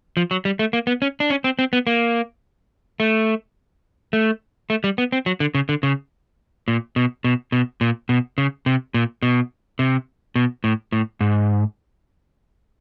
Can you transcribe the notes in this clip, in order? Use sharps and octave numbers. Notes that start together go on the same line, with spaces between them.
F3
F#3
G3
A3
A#3
B3
C#4
D4
C#4
C4
C4
B3
A#3
A3
A3
A3
G3
B3
C4
F#3
D3
C#3
D3
C#3
A#2
B2
B2
B2
A#2
B2
C#3
C3
A#2
B2
C3
B2
A2
A2
G#2